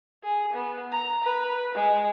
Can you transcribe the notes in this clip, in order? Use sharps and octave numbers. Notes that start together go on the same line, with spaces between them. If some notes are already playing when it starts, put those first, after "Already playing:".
G#4
B3
A#5
B4
G#3